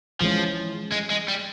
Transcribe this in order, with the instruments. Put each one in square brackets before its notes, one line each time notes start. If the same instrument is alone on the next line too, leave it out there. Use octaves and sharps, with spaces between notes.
[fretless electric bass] E3 G#3 C#4 [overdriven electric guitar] F3
[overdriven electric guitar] G#3
G#3
G3